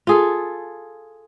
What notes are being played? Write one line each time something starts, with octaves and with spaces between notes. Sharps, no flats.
F4 G#4 A4